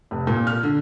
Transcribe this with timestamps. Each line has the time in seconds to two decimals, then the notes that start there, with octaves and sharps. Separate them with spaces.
0.11 F1
0.27 A#2
0.47 F6
0.63 D3